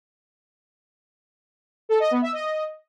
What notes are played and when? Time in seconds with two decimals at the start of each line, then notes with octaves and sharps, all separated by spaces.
1.89 A4
2.00 D#5
2.11 B3
2.22 E5
2.33 D#5